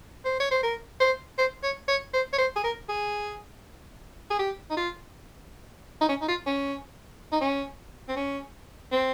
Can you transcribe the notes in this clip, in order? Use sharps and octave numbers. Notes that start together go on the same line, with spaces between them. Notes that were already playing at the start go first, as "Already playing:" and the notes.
C5
C#5
C5
A#4
C5
C5
C#5
C#5
C5
C#5
C5
G#4
A#4
G#4
G#4
G4
D#4
F4
D#4
C#4
D#4
F4
C#4
D#4
C#4
C4
C#4
C4